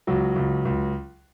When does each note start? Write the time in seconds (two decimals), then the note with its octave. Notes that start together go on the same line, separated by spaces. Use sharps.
0.07 C#2 F#3
0.36 C#2
0.65 C#2